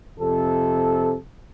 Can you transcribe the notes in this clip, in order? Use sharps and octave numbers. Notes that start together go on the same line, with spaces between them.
F2 C3 A4